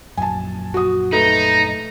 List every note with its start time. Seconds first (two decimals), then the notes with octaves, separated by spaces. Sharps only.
0.17 A#1 F#2 G#5 A5
0.74 F#4 D#6
1.13 A3 D#4 B4 A#5